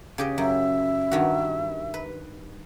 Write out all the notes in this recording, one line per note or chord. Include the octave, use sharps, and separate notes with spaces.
C#3 G4 D#5
F#2 E5
G2 D#3 F#4
B4